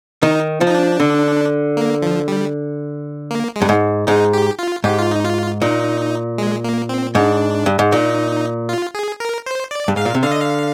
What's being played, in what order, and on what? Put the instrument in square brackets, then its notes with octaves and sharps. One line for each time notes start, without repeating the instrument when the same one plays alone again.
[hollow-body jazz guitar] D#3 [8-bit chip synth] D#4
[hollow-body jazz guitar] F3
[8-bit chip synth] D#4
D4
[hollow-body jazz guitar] D3
[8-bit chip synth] A#3
F3
G3
A#3
G#3
[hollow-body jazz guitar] G2
G#2
[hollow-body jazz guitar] G#2 [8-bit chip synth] D#4
[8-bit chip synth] G4
F4
[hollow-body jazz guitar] G#2 [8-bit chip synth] G4
[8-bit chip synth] F4
D#4
F4
[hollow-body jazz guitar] A#2 [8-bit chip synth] D#4
[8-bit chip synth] G#3
A#3
C4
[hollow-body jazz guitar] G#2 [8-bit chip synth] D4
[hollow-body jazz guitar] G2
G#2
[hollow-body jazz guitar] A#2 [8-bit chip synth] D#4
[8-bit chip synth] F4
G#4
A#4
C5
D5
[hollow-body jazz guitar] G2
[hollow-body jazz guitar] G#2 [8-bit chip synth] F5
[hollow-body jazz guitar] A#2
C3
[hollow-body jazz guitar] D3 [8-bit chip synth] F5
[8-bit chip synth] D#5
F5